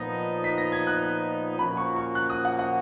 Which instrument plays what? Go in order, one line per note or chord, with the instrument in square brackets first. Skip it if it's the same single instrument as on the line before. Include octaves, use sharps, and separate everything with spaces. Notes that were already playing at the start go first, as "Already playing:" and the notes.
Already playing: [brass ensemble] A#2 F3 B3 D#4 [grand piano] A#6
[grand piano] B6
A#6
G#6
F#6
[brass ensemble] A#2 F3 A#3 C#4 F#4 [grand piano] B5
[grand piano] C#6
C#6
F#6
D#6
F#5
F#5